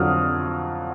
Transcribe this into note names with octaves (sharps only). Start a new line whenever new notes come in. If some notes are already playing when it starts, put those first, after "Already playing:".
Already playing: F2 D3 F#3 D#6 F6